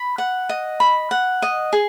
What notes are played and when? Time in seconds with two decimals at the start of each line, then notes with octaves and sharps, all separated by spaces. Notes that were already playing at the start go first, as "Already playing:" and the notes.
Already playing: B5
0.18 F#5
0.49 D#5
0.80 B5
1.11 F#5
1.42 D#5
1.73 G#4